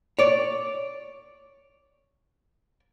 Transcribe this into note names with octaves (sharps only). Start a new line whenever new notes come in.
C#5 D5